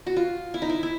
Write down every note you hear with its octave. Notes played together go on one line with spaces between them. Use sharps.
F#4
F4
E4
D#4
E4
E4